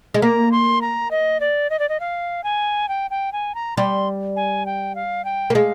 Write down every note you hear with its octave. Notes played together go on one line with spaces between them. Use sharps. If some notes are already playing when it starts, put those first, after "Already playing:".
G#3
A#3 A#5
C6
A#5
D#5
D5
D#5
D5
D#5
F5
G#5
G5
G5
G#5
A#5
G3 C6
G#5
G5
F5
G5
A#3
G#3 F5